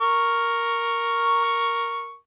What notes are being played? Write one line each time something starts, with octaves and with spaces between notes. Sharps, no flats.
A#4 C#6